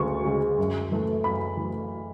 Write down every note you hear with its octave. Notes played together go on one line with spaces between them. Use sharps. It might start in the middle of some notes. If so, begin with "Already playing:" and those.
Already playing: D2 C#3 G#3 C#6
C#3 G#3
F#2
E3 A3
F#2 B5
E3 A3